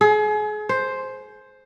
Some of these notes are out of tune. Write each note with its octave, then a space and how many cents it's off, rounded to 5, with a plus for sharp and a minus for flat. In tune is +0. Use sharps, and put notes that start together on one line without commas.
G#4 +35
C5 +5